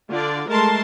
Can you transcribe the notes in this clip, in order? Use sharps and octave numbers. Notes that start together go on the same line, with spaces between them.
D3 F4 D5
G#3 A3 A#4 A5 C6